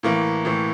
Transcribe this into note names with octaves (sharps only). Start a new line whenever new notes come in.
A2 E3 A#3
A2 E3